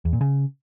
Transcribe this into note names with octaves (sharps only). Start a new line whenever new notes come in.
E2
A#2
C#3